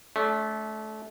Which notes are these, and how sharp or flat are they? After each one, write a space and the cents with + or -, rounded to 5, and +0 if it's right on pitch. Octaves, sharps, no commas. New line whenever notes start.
A3 -25 D4 -40